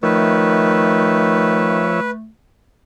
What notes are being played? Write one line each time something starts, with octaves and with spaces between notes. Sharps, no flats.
D#3 F3 A3 B4 C#5 E5